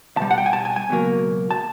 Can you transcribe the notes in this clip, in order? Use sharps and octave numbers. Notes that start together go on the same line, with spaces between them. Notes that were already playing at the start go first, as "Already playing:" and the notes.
C2 B2 G3 A5
F#5
G5
G#5
A5
G#5
G#5
C#2 B2 F#3 A#3
A5